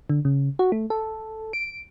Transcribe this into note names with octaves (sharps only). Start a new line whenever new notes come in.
D3
C#3
F#4
A3
A4
D7